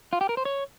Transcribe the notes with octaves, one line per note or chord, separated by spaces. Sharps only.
F4
G4
A#4
C5
C#5